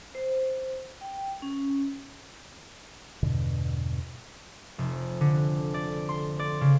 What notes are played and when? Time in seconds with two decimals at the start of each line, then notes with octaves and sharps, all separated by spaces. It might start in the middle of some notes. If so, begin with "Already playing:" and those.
0.15 C5
1.01 G5
1.42 C#4
3.23 E2 G2 B2 D3
4.78 F1
5.21 D3
5.74 D5
6.09 C6
6.39 D5
6.61 C#3